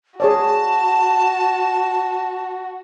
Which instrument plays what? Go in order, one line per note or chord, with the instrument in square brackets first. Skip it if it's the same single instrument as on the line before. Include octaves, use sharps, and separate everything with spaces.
[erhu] F#4 [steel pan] G#4 C#5 D5 [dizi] A5